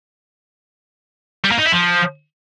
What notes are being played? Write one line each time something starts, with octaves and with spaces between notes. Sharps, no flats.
G3
A#3
D#4
E4
F3